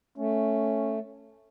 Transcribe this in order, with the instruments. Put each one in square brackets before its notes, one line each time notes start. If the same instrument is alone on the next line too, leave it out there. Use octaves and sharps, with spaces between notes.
[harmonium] A3 [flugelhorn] C#4